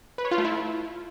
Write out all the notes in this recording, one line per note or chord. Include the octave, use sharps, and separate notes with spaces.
B4
C#5
F4
A3
E4